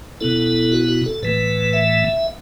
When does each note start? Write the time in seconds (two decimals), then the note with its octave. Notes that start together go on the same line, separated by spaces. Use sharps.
0.21 B2 B3 E4 A4
0.72 F#4
0.88 F#4
1.06 A4
1.23 A2 E3 A3 B4
1.73 E5